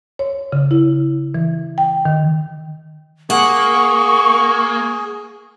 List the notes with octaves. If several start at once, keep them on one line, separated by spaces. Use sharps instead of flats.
C#5
C#3
E4
E3
G5
D#3
A#3 G#4 F#5 C#6